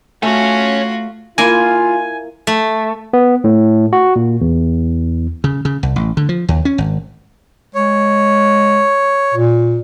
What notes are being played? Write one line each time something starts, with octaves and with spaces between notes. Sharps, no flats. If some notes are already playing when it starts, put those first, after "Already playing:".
A3 F4 F#4 C#5 G#5
A#3 E4 F4 G#5
A3
B3
A2
F#4
A#2
E2
C#3
C#3
C2
A1
D3
F3
D#2
C#4
G#1
G#3 C#5
A#2